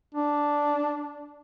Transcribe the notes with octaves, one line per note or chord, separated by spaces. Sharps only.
D4